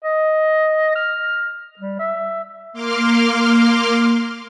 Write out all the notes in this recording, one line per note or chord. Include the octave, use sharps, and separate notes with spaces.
D#5
F6
G3
E5
A#3 C6 D6 F6